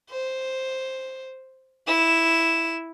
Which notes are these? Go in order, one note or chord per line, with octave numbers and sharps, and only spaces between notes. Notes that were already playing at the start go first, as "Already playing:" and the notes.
C5
E4 E7